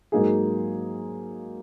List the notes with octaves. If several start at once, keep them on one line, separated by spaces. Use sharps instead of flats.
G#2 F#3 A#3 D#4 G#4